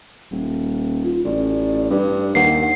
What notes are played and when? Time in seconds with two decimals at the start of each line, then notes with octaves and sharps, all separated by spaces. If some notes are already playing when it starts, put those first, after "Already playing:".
0.31 D#1
1.04 F4
1.25 A1 D5
1.90 G2 B4
2.35 D#2 F#5 C7